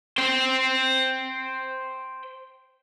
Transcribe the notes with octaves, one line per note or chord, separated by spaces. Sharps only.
C5 G5